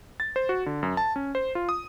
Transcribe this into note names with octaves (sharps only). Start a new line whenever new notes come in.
A6
C5
F#4
D3
F#2
A5
C#4
C5
F4
D#6